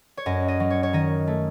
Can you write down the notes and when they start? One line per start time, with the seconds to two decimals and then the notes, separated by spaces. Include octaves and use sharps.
0.17 C#5
0.26 F#2 D#5
0.48 D#5
0.60 F#3
0.70 C#5
0.83 C#5
0.93 D#3 D#5
1.27 A3